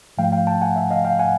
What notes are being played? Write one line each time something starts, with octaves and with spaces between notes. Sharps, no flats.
G#2 F3 A3 F5 G5
F5 G5
G5 A5
F#5 G#5
E5 F#5
D#5 F5
F5 G5
F#5 G#5